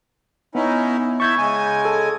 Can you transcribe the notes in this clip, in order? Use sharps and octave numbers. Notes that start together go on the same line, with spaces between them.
B3 C#4 D#4 E4
E4 E5 A5 C#6 G6 G#6
C#3 G#3 G#5
A4